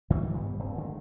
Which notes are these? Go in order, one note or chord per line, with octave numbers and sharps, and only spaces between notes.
E2 D#3 F3 G3
G2 G3 B3
D#1 G2 C#3 C4
D3 D#3 G#3 A3